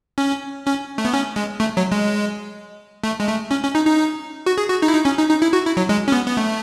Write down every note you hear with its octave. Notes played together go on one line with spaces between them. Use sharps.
C#4
C#4
A3
B3
C#4
G#3
A3
F#3
G#3
A3
G#3
A3
C#4
C#4
D#4
D#4
F#4
G#4
F#4
D#4
E4
D#4
C#4
D#4
D#4
E4
F#4
E4
F#3
G#3
C#4
B3
B3
A3